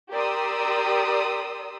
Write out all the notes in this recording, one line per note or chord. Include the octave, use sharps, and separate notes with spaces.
G4 A#4 D5 C6 D#6 E6